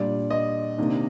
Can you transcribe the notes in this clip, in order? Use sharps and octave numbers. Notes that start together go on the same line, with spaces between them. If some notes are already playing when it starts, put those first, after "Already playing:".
Already playing: A#2 G3 D4 D5
D#5
C3 D#3 A#3 D4